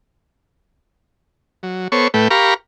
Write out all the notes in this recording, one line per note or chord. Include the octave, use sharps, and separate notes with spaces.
F#3
B3 A4 C5 C#5 C#6
A2 A3 B4 G5
G4 A#4 F5 A#5 B5 C#6